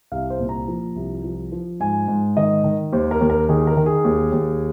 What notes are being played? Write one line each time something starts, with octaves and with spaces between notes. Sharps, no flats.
C2 F5
C5
A#2
A#5
F3
C2
F3
F3
G#2 G#5
G#2
D#3 D#5
D#3
D#2 C5
A#4
D#2
A#4
D#3 G#4
A#4
D#3
G#4
D#2
D#2